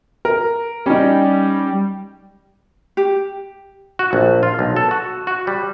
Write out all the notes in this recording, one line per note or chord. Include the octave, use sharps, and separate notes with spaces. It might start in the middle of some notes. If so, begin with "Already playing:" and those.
A#4
G3 C#4 D#4
G4
F#4
A#1
F4
B1
A4
F#4
F#4
G3